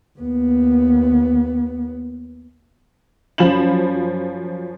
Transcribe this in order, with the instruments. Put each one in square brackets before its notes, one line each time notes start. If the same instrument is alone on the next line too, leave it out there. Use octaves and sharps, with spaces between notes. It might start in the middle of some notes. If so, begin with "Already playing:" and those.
[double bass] D#2 B3
[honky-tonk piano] F#2 F3 B5 E7 F#7